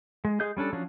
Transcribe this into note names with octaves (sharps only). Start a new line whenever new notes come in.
G#3
G#3 G#4 D#5 G6
G3 C#4 D4 A4
F3 F#3 C#4 D4